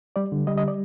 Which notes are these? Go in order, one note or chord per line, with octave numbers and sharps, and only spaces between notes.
G3 D5
D3
G3 D#5
D#5
D5